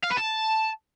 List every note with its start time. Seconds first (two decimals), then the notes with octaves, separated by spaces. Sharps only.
0.04 F5
0.10 B4
0.17 A5